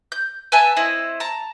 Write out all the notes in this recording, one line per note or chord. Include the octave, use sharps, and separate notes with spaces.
G6
B4 E5 G#5 A5
C4 E4 D#5
A5 A#5